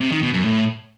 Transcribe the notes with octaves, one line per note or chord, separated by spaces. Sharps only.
C3
D#3
B2
F#2
A2